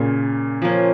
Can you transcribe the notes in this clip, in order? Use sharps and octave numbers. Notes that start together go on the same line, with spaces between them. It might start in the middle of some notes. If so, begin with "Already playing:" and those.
Already playing: A#2 C#3
F3 A#3 C#4